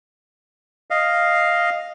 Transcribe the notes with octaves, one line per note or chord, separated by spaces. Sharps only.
D#5 F5